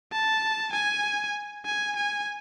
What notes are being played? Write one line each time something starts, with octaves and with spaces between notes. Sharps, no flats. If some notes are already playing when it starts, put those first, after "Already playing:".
A5
G#5
G#5
G#5